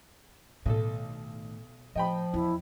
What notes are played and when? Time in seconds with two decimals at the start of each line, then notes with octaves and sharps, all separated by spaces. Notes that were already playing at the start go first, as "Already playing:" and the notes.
0.66 B1 A2 D#3 A4
1.96 A2 F3 D#5 G5 B5
2.34 E2 E4